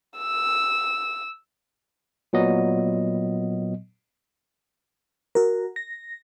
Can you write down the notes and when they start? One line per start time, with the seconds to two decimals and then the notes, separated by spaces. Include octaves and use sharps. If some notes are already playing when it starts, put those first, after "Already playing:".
0.18 E6
2.33 A#2 F#3 B3 D#5
5.35 F#4 A#4
5.76 A#6